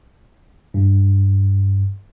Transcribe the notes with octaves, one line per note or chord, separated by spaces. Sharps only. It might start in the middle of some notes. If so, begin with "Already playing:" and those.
G2